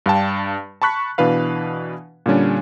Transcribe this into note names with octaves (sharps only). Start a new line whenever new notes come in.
G2 D4 F5 G5 A5
A5 B5 C#6 F#6 B6
B2 E3 D4 B4 F5
A#2 D3 G3 C#4 D4